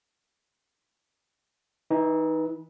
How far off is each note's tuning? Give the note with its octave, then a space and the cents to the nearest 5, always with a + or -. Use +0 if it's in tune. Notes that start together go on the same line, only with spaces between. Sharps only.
E3 -20 D#4 +10